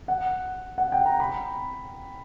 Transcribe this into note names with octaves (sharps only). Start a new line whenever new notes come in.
F#5
F#5
G5
A#5
B5